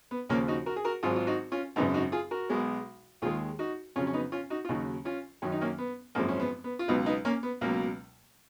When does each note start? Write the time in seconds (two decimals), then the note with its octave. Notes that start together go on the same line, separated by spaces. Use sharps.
0.11 B3
0.29 D#2 C#3 F3 A#3 C#4
0.48 D#4 F#4
0.66 F#4 A#4
0.76 G#4
0.85 F#4 A#4
1.03 G#1 G#2 F#3 F4 G#4
1.16 F4
1.27 D#4 F#4
1.52 C#4 F4
1.76 G#1 F#2 C#3 B3 D#4
1.94 D#4 F#4
2.12 F4 G#4
2.31 F#4 A#4
2.50 B1 B2 G#3
3.22 D#2 D#3 G#3 F4 G#4
3.59 D#4 F#4
3.96 F2 C#3 F#3 C#4 F4
4.07 C#4
4.13 B3 D#4
4.32 C#4 F4
4.50 D#4 F#4
4.65 F4
4.69 D#2 C#3 F#3 D#4 F#4
5.05 C#4 F4
5.42 F#2 D#3 F#3 C#4
5.52 D#4
5.61 A#3 C#4
5.78 B3
6.15 G#1 F#2 F3 G#3 A#3
6.28 C#4
6.40 B3
6.64 B3
6.79 F4
6.88 C#2 B2 F#3 B3 D#4
7.06 B3 D#4
7.25 A#3 C#4
7.43 B3
7.61 C#2 B2 F#3 A#3